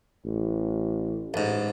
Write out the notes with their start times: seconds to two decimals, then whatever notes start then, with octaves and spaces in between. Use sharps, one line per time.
0.24 A1
1.34 A1 G#2